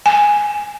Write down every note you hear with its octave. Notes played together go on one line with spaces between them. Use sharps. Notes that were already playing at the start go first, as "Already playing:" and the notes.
G#5